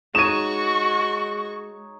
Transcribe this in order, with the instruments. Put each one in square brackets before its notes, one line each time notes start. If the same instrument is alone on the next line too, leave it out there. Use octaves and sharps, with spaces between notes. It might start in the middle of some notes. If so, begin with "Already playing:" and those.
[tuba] G#3 [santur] D#4 C#5 [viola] F#4 C#6 [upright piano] D#7 E7